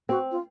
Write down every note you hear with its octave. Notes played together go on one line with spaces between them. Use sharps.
C4 F#4
F4